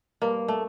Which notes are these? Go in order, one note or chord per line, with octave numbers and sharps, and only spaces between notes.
G2 A#3
A3